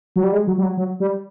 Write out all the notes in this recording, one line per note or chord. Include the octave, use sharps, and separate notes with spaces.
F#3
G3
G#3
F#3
G3
F#3
F#3
G3